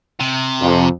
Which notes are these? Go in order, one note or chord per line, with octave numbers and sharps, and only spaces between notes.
C3
F2